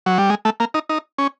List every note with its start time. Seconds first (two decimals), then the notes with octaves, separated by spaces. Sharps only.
0.06 F#3
0.18 G3
0.30 G#3
0.45 A3
0.60 A#3
0.74 D#4
0.89 D#4
1.18 C#4